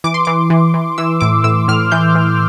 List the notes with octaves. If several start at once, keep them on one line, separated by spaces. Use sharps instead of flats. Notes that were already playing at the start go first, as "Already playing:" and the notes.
E3 D6
C6
E3 D6
E3
E3
E3 E6
A2 D6
A2 E6
A2 F6
E3 G6
E3